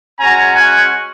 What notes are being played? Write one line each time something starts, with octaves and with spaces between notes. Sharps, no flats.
G#3 C#4 F#4 G#5 A#5
F#5 G#5